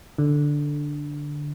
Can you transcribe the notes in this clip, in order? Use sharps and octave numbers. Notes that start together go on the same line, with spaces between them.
D3